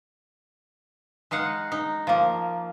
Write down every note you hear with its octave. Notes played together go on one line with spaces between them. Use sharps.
G#3 D#4 F5 F#5
D#4
F3 A#3